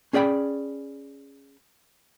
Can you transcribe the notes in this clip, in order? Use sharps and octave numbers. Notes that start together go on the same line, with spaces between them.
C#4 G#4 D5 G5 B5